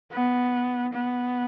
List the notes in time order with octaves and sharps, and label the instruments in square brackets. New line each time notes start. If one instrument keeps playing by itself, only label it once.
[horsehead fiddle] B3
B3